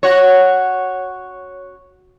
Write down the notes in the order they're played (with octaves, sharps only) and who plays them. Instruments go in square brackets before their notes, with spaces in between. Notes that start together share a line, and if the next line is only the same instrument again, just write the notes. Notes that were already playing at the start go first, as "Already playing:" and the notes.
[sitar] F#4 C#5